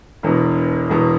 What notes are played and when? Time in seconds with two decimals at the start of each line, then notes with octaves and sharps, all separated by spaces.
0.23 E1 E2 B2
0.89 E1 E2 B2